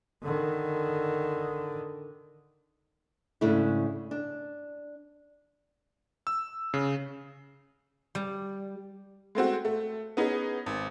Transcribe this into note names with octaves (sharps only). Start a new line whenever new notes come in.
D3 D#3
G#2 C#3 A3 D4 E4
D4
E6
C#3
G3
G#3 A3 C4 F#4
A3
B3 C#4 D#4 G#4
G#1